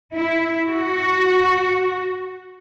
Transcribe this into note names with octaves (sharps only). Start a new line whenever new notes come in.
E4
F#4